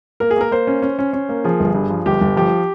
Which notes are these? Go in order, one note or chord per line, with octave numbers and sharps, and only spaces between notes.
A#3 A#4
G#4
A#3 A#4
A#3 C5
C#4
C#4
C#4
C#4
A#3
F3 G#4
G1
G2
F3
G1 G4
G1
F3 G4